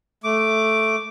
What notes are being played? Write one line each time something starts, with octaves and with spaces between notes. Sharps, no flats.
A3 D6